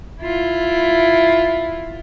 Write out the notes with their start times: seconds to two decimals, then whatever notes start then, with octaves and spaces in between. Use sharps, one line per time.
0.21 E4 F4